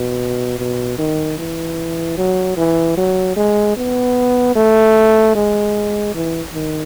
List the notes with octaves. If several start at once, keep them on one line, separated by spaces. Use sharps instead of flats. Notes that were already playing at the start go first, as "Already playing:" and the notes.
Already playing: B2
B2
D#3
E3
F#3
E3
F#3
G#3
B3
A3
G#3
E3
D#3